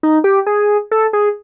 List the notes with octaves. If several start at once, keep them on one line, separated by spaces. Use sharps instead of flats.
D#4
G4
G#4
A4
G#4